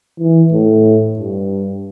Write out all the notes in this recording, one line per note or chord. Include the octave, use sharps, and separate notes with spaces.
E3
A2
G2